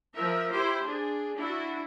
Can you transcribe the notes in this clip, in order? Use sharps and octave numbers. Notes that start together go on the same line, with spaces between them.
F3 A#4 E5
E4 G4 C5
D4 G#4
D4 E4 F#4